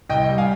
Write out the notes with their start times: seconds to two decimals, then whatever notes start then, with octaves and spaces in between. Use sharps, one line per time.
0.09 C2 D#5 G5
0.29 G3
0.38 F5 G#5